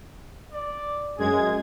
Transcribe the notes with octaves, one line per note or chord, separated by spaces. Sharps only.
D5
F#2 G#3 G#4 G#6